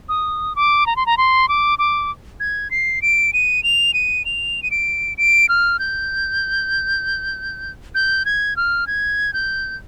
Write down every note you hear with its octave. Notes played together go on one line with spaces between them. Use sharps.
D#6
D6
A#5
C6
A#5
C6
D6
D6
G#6
C7
D7
D#7
F7
D#7
F7
D#7
D7
D7
F6
G6
G6
G#6
F6
G#6
G6